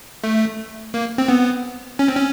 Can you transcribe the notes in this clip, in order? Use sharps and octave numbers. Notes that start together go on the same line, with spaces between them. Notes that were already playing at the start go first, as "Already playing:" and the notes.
A3
A#3
C4
B3
C#4
C4
C#4